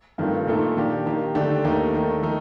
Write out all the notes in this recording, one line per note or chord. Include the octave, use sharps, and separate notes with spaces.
G2 D#3 A3 C4 F4
A#2 A3 D#4 A4
D#3 A#3 D4 G4
D#3 A#3 D#4 G4
D3 A3 D4 G4
D#2 D#3 A3 D#4 G4
D#3 A3 D#4
D#3 A3 D#4